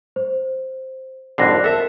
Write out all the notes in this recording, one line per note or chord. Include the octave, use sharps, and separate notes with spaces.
C5
G#1 F2 D3 F#6 A#6 C7
A4 A#4 E5